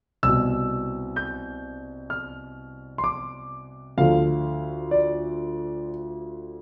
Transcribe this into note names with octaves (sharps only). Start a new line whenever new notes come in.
C2 B2 E6
G6
F6
C6
D6
D2 D3 F3 F5
D5